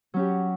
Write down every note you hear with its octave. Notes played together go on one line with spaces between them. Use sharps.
F#3 C#4 G4